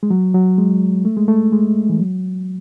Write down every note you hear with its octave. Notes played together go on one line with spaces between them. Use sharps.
G#3
F#3
F#3
G#3
A3
G#3
A3
G#3
E3
F#3